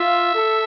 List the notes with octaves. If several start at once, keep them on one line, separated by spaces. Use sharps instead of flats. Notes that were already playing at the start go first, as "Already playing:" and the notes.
Already playing: F4 E5
A4